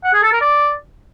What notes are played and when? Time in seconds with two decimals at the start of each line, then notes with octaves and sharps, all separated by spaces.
0.04 F#5
0.14 G#4
0.23 A4
0.32 A#4
0.41 D5